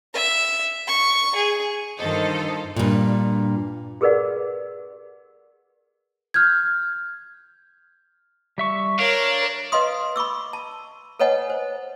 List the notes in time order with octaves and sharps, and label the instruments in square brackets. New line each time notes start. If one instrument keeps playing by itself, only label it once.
[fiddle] E5
C#6
G#4
[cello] G2 D#3 [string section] F4 A4 [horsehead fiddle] C5 D#5
[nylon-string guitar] G2 A#2
[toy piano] G4 G#4 A#4 B4 D5 F#5
[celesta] F6 G6 G#6
[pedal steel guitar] G3 E5 C#6
[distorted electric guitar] D4 [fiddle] A#4 C#5 [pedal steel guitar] F5
[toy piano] B4 D#5 F5 C6 D#6
B5 C#6 D6 E6
A5
A4 B4 C#5 D#5 F#5 G#5
C5